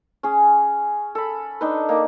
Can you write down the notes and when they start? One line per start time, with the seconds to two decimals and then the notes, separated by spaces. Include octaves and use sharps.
0.23 C#4 G#4
1.15 A4 B5
1.61 D4 D#4 B4
1.89 A#3 D#4